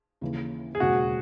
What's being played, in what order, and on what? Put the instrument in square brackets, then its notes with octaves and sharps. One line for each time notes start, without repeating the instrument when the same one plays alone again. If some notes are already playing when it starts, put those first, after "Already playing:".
[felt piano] D#2 C#3 E3
[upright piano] G#4
[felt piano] E1 D#2 C#3 [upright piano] F#4